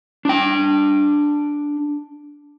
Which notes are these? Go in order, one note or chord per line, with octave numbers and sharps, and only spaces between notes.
D4 G5